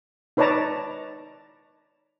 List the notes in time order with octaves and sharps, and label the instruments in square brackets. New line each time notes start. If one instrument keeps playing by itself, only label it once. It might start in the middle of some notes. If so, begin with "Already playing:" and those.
[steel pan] D#4 B4 C#5 D5 A5 A#5